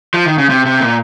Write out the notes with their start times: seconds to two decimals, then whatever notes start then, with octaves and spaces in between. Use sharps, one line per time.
0.14 F3
0.26 D#3
0.38 C#3
0.49 C3
0.66 C3
0.80 A#2